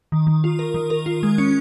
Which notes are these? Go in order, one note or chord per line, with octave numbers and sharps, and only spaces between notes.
D#3
D#3
F4
A#4
D#3
A#4
F4
G#3
C#4